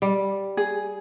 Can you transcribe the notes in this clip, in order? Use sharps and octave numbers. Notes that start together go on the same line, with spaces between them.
G3
G#4